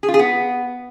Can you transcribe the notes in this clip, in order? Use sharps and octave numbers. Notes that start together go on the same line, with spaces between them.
G#4
F4
G#4
B3